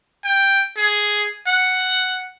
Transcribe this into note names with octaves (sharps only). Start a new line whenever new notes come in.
G5
G#4
F#5